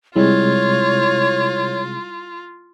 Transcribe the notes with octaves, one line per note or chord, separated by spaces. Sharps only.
C3 G3 G#3 E4 F4 C#5